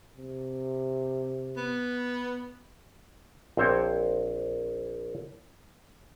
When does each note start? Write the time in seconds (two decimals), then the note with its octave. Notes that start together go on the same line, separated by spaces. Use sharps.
0.17 C3
1.57 B3
3.57 A#1 C4 C5 C#5 G5